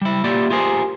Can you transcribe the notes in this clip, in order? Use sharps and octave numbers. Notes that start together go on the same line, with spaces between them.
G3 E4
A#3 E4 F4 G4 D5 E5
F4 G4 G#4 A#4 C5